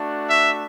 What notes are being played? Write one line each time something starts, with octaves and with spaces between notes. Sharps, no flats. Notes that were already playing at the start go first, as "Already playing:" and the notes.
Already playing: A3 D4 F#4
E5